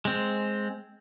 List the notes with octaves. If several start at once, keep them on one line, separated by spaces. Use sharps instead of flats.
G#3 C4